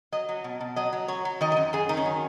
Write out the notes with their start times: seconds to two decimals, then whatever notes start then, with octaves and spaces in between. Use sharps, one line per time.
0.12 F#3 D#5
0.29 F#3
0.44 B2
0.61 B2
0.76 F#3 D#5
0.92 F#3
1.08 F#3 C#5
1.25 F#3
1.41 D#3 D#5
1.52 F#2 D#5
1.73 F#2 G#4
1.89 D#3 D#4
1.97 C#4
2.06 F#3